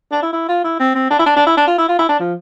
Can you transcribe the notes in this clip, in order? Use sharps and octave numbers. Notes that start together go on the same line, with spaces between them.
D4
E4
E4
F4
E4
C4
C4
D4
E4
D4
D4
E4
D4
F4
E4
F4
E4
D4
F3